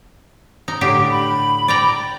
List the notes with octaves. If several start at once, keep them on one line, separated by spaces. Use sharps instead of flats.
D#4
A2 D3 G4
B5
D5 G5 A#5